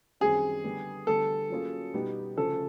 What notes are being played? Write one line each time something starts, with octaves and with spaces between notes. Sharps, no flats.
F#2 D#3 G3 C4 G#4
D3 G3 B3
D3 G3 B3 A4
F#3 A#3 C#4 F4 G#4
B2 G3 B3 D#4 G4
D2 C#3 F3 A3 C#4 A4